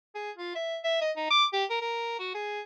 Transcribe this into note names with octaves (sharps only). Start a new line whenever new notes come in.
G#4
F4
E5
E5
D#5
D#4
D6
G4
A#4
A#4
F#4
G#4